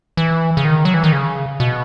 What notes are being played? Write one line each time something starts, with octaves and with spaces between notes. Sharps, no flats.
E3
C#3
D#3
F#3
E3
D#3
C#3
B2